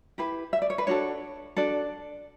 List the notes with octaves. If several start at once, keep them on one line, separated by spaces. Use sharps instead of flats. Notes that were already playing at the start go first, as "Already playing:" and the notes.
E4 G4 B4
E5
D5
C#5
B4
D4 F#4 A4 C#5
D4 F#4 A4 D5